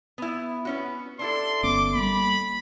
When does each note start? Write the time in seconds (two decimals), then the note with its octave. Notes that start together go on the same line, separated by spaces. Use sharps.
0.18 B3 E4
0.65 B3 C#4 F#4
1.19 D4 E4 A4 C6
1.63 G1 B3 C#4 D6
1.94 G3 A#3 B5